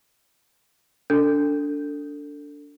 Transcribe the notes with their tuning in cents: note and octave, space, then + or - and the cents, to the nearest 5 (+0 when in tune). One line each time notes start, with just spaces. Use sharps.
D4 -20 F#4 +0 A4 +25